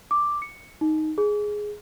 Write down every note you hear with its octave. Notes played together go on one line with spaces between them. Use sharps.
D6
C#7
D#4
G#4